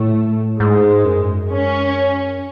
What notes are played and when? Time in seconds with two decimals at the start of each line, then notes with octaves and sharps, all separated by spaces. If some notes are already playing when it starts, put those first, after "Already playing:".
Already playing: A2 A3
0.60 G#2 G#3
1.05 F#2
1.51 C#4